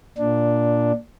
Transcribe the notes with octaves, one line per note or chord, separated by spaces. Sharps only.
A#2 D4